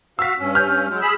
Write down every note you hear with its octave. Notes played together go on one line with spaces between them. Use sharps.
F#4 F5 E6 B6
G2 C#4
F6 G6
F#3 G#3
G#4 B5 E6